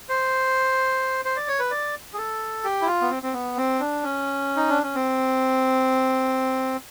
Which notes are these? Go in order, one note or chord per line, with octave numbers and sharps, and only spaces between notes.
C5
C5
D5
C#5
B4
D5
G#4
A4
G4
E4
F4
B3
C4
C4
B3
C4
D4
C#4
D#4
D4
C#4
C4